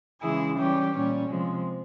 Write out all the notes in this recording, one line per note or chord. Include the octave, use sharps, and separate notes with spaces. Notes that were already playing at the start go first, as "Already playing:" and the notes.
C#3 E3 G#3 E4 G#4
E3 G3 C#4 G4
A#2 G3 C#4
C3 F3 G#3